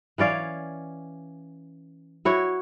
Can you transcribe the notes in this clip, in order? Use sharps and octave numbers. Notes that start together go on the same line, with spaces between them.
E3 C#4 D5 F5
E4 F#4 C#5